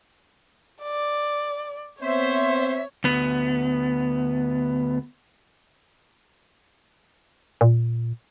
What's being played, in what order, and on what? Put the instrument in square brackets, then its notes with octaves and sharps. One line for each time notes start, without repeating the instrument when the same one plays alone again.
[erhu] D5
[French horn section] B3 C4 [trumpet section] C5 [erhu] C#5 [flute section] E5
[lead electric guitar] D2 B3
[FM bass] A#2